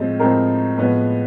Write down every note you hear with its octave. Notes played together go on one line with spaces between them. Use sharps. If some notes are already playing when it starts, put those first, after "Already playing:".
Already playing: A2 F3 G#3 C4
A2 F3 G#3 C4 A#4
A2 F3 G#3 B3 B4